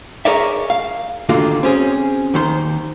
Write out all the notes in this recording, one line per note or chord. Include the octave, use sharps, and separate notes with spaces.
G#4 A#4 C#5 D5 E5
F5
D#2 D3 A#3 F4 F#4 F5
C4 C#4 G#4
D#2 D#3 C5